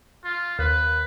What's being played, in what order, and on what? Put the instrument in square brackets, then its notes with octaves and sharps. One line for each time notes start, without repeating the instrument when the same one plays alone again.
[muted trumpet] F4
[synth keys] D#2 [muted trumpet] B4